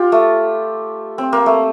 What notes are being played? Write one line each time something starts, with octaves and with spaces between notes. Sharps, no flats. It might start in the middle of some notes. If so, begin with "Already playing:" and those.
Already playing: F4 G4
A3
C4
A#3
A3